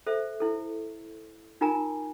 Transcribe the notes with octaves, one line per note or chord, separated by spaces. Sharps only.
A4 C5 E5
E4 A4
D#4 F4 A#4 G#5 A#5